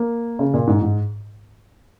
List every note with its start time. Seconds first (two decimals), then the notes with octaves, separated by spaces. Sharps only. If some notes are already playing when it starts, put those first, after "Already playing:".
Already playing: A#3
0.39 C#3
0.54 A#2
0.67 G#2
0.82 G#2